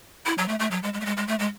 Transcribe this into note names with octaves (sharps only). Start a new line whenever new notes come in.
E4
F#3
A3
A3
F#3
G#3
G#3
A3
G#3
G#3
A3
G#3